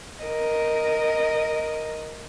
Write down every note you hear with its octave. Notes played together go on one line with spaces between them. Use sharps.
A#4 D#5